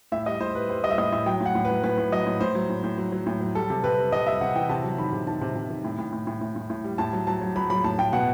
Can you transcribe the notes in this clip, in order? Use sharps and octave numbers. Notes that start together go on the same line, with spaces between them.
A2 E5
G3 D#5
A2 C5
G3 B4
G3 C5
G3 D#5
E5
A2 D#5
A2 E5
F#3 G5
A2
F#5
A2
F#3 B4
A2 B4
A2
F#3 D#5
A2
A2 C5
F#3
A2
A2
F#3
F#3
A2
F#3
G3 A4
C3
C3 B4
G3
C3 D#5
G3 E5
C3 F#5
E3 G5
C3 A5
F#3
D#3 B5
C3
D#3 A5
C3
C3
D#3
A2
A2
A2
A2
A2
A2
A2
G3
A2 A5
F#3
F#3 A5
F#3
F#3 B5
F#3 B5
A2 A5
A2 G5
B2 F#5